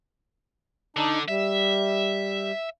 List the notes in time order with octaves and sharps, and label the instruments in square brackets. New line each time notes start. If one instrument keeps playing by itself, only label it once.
[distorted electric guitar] D3 [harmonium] D4 D#4
[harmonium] G3 [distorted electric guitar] E5